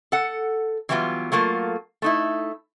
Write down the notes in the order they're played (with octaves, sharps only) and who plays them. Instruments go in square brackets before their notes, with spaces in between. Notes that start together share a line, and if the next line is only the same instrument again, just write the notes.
[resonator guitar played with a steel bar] A4 F#5
E3 F#3 G3 B3 F4
F#3 A3 A#3 F4
A3 D#4 E4